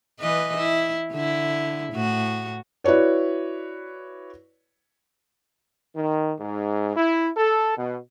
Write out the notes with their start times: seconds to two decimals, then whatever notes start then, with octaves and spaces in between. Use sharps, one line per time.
0.20 E3 B4 D#5
0.56 E4
1.12 D3 E4
1.93 A2 F#4
2.84 E4 F#4 B4 C#5 D5
5.95 D#3
6.40 G#2
6.96 E4
7.36 A4
7.77 B2